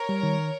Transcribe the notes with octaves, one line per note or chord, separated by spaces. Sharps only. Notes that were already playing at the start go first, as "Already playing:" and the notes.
Already playing: A#4 C#5
G3
D#3